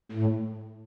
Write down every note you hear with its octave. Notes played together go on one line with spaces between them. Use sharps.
A2